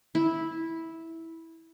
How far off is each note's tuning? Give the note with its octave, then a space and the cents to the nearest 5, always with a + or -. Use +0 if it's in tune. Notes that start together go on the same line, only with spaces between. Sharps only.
E4 -10